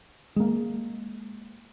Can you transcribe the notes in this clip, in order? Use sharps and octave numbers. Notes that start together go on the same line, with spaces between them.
G#3 A#3